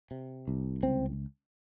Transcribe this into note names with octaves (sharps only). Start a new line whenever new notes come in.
C3
C2
C#2 C4